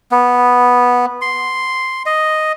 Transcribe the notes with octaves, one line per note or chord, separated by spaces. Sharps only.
B3
C6
D#5